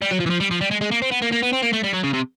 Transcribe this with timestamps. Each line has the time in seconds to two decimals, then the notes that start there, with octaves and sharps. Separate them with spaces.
0.02 G3
0.11 F#3
0.20 F3
0.26 E3
0.30 F3
0.40 G3
0.51 F3
0.61 G3
0.71 G#3
0.81 G#3
0.91 A#3
1.02 C4
1.11 B3
1.22 A#3
1.32 A#3
1.42 B3
1.53 C4
1.62 A#3
1.73 A3
1.83 G3
1.93 F#3
2.03 C#3
2.13 C3